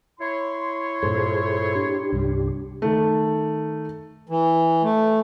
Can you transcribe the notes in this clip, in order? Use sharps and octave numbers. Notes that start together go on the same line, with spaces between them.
E4 C#5 C6
G2 A#2 G#4 A4 C5
D4 G4
C2 G2 G3
D#3 A3
E3
A3